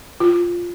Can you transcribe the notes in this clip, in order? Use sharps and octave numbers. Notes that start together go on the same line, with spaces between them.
F4